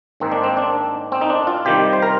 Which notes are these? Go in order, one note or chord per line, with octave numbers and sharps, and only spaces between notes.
G#2 D#3 A#3 C4
D4
C4
D4
C4
D#4
D4
F4
C3 D#3 G3 G4
C5
A#4